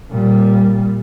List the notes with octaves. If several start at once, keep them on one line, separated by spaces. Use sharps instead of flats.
A#2 G3